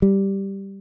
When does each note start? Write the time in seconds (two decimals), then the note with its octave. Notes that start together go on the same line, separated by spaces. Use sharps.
0.02 G3